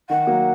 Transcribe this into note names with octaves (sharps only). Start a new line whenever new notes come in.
D#3 F#5
F#3 A#3